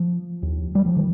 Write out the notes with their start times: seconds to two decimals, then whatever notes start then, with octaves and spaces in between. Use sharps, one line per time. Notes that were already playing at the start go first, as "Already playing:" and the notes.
Already playing: F3
0.42 D#2
0.75 G3
0.86 F3
0.96 D#3